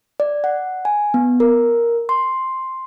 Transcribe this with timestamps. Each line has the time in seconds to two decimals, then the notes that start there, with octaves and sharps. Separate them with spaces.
0.20 D5
0.44 F#5
0.85 G#5
1.14 B3
1.40 A#4
2.09 C6